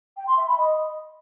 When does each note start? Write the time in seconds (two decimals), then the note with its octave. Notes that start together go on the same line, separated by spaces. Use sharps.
0.17 G5
0.27 C6
0.37 E5
0.47 B5
0.57 D#5